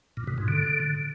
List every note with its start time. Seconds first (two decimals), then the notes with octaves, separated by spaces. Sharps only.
0.17 A#2
0.27 B2
0.38 G#2
0.48 D3